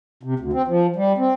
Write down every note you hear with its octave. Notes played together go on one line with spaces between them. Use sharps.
C3
D2
C4
F3
G3
C4